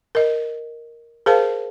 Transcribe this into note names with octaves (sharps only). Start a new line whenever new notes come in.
A#4 D#5
G#4 A#4 C5 F5 A5